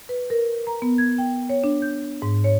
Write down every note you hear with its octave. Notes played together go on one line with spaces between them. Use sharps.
B4
A#4
A#5
B3
G#6
G5
C#5
D4
G6
G#2
C#5